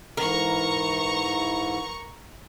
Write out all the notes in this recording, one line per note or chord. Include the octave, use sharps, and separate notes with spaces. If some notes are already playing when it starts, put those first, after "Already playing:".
G#2 E3 A#4 A#5 C#6